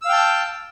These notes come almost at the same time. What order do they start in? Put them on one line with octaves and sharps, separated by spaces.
E6 F5 G5 A5